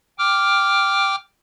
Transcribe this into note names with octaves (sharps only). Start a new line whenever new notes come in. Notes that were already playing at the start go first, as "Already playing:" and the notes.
G5 D6 F6